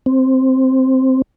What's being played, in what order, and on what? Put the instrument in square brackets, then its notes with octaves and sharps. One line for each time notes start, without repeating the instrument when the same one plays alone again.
[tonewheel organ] C4